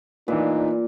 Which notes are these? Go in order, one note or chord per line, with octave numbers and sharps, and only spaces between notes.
A#2 E3 D4 D#4 B4